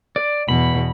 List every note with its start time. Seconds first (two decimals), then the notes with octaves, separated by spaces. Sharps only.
0.16 D5
0.49 E2 B2 B5